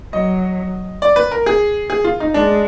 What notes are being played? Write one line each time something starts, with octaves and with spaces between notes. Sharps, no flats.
F#3 D#5
D5
B4
A#4
G#4
G#4
F4
D#4
G#3 D4